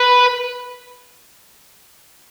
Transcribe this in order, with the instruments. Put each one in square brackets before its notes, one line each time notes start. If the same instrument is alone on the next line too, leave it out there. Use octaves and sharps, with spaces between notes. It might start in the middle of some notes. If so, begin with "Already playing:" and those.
Already playing: [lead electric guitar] B4